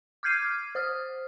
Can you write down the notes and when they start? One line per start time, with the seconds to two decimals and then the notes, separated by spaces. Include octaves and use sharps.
0.23 D6 F6 G6 G#6 C7 D#7
0.44 F6
0.75 C5 D#6 F6